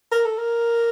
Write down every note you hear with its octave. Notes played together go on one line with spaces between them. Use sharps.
A#4
A4
A#4